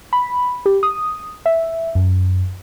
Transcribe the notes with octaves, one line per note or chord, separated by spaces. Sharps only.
B5
G4
D#6
E5
F#2